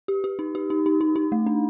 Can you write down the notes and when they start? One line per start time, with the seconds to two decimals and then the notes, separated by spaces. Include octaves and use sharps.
0.08 G4
0.24 G4
0.39 D#4
0.55 G4
0.70 D#4
0.86 D#4
1.01 D#4
1.16 D#4
1.32 A3
1.46 D4